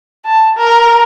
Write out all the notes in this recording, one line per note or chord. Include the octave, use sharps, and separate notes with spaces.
A5
A#4